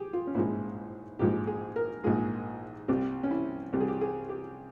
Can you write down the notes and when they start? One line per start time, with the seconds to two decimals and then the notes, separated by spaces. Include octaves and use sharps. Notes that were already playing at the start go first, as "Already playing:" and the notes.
Already playing: G4 G#4
0.13 F4
0.27 C#4
0.35 A#1 G#2 F3 G#3 E4
1.19 A#1 G#2 F3 G#3 G4
1.47 G#4
1.76 A#4
2.04 A#1 G#2 F3 G#3 G#4
2.88 C2 C3 G3 G4
3.23 C#4
3.31 E4
3.73 C2 C3 G3 G4
3.81 G#4
3.88 G4
4.01 G#4
4.29 G4